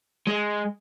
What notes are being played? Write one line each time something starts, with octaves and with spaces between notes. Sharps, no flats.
G#3